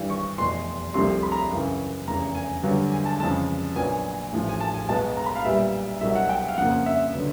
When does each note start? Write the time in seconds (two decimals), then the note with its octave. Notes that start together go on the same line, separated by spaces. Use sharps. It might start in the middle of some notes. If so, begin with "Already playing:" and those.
Already playing: G#1 G2 E3
0.10 C#6
0.38 F1 E2 B2 C6
0.94 C2 C3 F3 A3 C6
1.23 B5
1.32 A#5
1.51 F#2 C#3 E3
2.07 F1 E2 C#3 E3 A#5
2.35 G#5
2.63 G2 D3 F#3 B3
2.92 G#5
3.05 A5
3.20 F2 C#3 E3 G#3 A5
3.76 A#1 A#2 F#3 B3 G#5
4.32 A1 A2 F3
4.49 G#5
4.61 A5
4.75 G#5
4.89 B1 B2 G#3 B3 A5
5.17 A#5
5.26 B5
5.36 F5
5.45 B1 A#2 G3 B3 E5
6.01 C2 B2 F#3 E5
6.15 F#5
6.29 G5
6.48 F5
6.57 F2 C#3 F3 A#3 F#5
6.86 E5
7.14 D3 F#3 B3